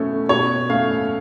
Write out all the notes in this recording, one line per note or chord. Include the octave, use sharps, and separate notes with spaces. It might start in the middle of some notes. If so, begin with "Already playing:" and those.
Already playing: B2 A3 C#4
B2 C#5
A3 C#4 F5